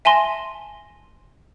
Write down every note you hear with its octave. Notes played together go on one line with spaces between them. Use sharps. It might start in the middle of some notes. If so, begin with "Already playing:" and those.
E5 G#5 A5 C6 A#6